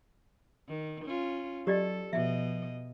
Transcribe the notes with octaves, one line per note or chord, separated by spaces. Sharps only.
D#3
C#4 F4
F#3 G4 A4 D5 D#5
B2 F3 D#5 E5